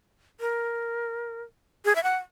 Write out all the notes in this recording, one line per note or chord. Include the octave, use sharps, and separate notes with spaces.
A#4
G#4
E5
F#5